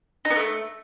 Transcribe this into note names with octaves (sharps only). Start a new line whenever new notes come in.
D#4
B3
A3